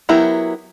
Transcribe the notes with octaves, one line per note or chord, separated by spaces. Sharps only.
F#3 B3 E4 G4 A#4